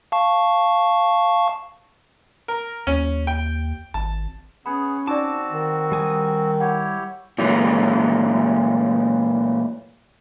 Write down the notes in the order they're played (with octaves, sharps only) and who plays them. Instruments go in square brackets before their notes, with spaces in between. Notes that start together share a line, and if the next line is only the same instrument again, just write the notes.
[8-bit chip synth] F5 A5 C#6
[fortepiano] A#4
[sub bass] D#2 [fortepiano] C#4
[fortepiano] G5
[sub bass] G#1 [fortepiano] A5
[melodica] B3 G#4 F#5 [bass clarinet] C#4 [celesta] B5
[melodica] C4 F#4 [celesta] D#4 D5 [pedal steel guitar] A5 D6
[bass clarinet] D#3
[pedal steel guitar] G3 G#5 D#6
[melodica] E4 G4 C#5 [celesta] F#5
[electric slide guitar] A#2 E3 F#3 G#3 A3